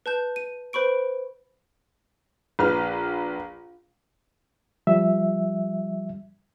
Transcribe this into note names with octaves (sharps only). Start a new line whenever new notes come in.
B4 A5 G6
D#7
B4 C5 B5 C#6 D7
A#1 B4 F6
F3 G3 E5